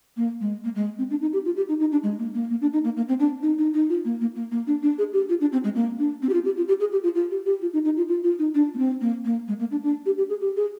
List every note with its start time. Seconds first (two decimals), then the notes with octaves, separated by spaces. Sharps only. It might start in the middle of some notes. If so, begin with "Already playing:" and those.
0.17 A#3
0.41 G#3
0.64 A#3
0.75 G#3
0.98 C4
1.11 D4
1.21 D#4
1.33 G4
1.45 F4
1.57 G4
1.69 D#4
1.80 D#4
1.92 D4
2.03 G#3
2.18 A#3
2.34 A#3
2.50 A#3
2.61 D4
2.73 D#4
2.84 A#3
2.96 A#3
3.08 C4
3.19 D4
3.43 D#4
3.58 D#4
3.74 D#4
3.89 F4
4.05 A#3
4.21 A#3
4.35 A#3
4.51 A#3
4.67 D4
4.83 D4
4.98 G#4
5.13 G4
5.29 F4
5.41 D4
5.52 C4
5.64 G#3
5.75 A#3
5.99 D4
6.22 C4
6.29 G4
6.33 F4
6.45 G4
6.57 F4
6.68 G4
6.80 G#4
6.92 G4
7.03 F4
7.15 F4
7.30 G4
7.46 G4
7.62 F4
7.73 D#4
7.85 D#4
7.97 F4
8.08 F4
8.24 F4
8.39 D#4
8.55 D4
8.74 A#3
8.78 C4
9.01 A#3
9.25 A#3
9.48 G#3
9.60 A#3
9.71 D4
9.83 D4
10.06 G4
10.18 G4
10.29 G#4
10.41 G4
10.56 G#4